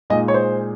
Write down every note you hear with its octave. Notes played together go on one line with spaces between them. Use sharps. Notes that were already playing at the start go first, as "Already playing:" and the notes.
A#2 G#3 D#4 G#4 D#5
C#5
C5